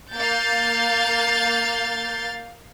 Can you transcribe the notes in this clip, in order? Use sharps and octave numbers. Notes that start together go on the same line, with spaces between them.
A#3 F5 G6 A6